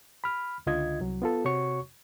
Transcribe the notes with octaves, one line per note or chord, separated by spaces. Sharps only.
B5 F6
C#2 D3 F4 D#5 G#6
C2 F#3
B3 F4 A4
C3 F#4 C#5 C#6